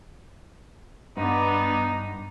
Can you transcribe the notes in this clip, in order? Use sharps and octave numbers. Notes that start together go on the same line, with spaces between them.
G2 B3 D4 D#4